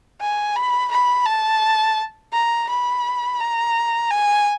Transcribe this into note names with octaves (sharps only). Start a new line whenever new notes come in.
G#5
B5
B5
A5
A#5
B5
A#5
G#5